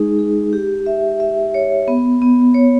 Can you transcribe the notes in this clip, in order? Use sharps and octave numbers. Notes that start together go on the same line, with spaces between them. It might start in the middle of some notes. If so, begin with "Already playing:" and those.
Already playing: G#3 D#4 G#4
G#4
G4
E5
E5
C#5
B3
B3
C#5